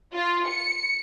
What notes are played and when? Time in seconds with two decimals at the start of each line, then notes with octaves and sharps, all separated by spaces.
0.14 F4
0.48 C#7